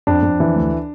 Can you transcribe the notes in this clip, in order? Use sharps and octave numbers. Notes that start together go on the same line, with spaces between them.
F2 D4
F2
E3
D2